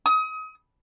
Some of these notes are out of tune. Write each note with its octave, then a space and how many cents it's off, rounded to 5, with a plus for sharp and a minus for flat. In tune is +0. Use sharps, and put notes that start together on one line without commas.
D#6 +30